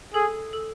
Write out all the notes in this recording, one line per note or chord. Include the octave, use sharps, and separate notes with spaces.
G#4 A4
A4